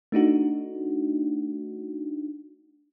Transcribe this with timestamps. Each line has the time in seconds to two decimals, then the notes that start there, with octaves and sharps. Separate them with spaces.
0.12 A3 D4 D#4 F#4